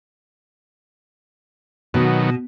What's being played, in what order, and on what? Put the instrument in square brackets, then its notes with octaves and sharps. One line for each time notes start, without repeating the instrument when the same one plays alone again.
[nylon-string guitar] B2 [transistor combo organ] D#3 F#3 B3